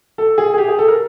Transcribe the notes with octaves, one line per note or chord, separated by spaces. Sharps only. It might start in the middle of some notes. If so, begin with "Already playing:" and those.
A4
G#4
G#4
G4
G#4
A4
A#4